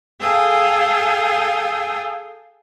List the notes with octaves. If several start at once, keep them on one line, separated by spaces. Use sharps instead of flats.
G#4 A4 F5 G5 G#5 D#6